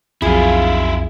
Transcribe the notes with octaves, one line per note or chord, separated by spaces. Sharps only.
B1 F2 E4 F4 G#4